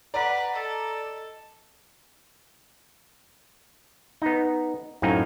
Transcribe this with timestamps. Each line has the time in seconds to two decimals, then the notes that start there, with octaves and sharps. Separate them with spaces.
0.14 B4 D5 F#5 A#5
0.53 A4 D#5
4.22 B3 D#4
5.02 F#2 A2 C4 D#4 F5 G#5